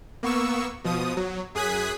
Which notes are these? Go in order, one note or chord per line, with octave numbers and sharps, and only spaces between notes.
A#3 B3 C#6 E6
B2 F3 D#6
F#3
F#2 G#4 D#6 F#6 G#6 B6